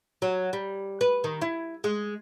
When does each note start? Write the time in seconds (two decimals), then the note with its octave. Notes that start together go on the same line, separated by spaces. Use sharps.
0.22 F#3
0.53 G3
1.01 B4
1.24 D#3
1.41 E4
1.84 G#3